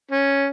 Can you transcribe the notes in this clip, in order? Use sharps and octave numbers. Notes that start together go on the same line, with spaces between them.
C#4